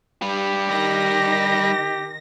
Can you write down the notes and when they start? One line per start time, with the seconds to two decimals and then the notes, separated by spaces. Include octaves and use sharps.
0.22 G3 G4 B4
0.69 D#3 A#6